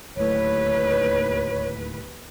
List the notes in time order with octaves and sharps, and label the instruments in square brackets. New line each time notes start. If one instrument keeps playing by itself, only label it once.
[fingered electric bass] D1 A2 [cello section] D#2 B4 [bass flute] C#5